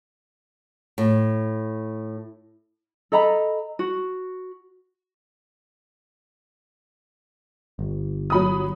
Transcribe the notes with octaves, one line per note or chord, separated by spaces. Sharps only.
A2
A4 D#5 A#5 B5
F#4
G1
F#3 B5 D#6